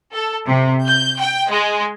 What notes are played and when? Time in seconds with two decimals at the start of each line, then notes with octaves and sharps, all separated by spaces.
0.13 A4
0.47 C3
0.86 G6
1.19 G5
1.50 G#3